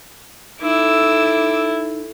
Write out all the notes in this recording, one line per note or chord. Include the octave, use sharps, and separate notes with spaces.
D#4 E4 A4 D6 E6